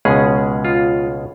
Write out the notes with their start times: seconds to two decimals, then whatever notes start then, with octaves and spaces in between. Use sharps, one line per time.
0.05 C#2 B2 G#3 C#4 G#4
0.65 F4